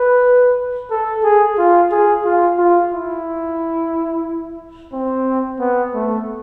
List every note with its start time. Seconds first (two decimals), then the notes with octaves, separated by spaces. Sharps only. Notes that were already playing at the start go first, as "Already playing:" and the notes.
Already playing: B4
0.91 A4
1.23 G#4
1.58 F4
1.91 G#4
2.25 F4
2.58 F4
2.91 E4
4.92 C4
5.59 B3
5.94 A3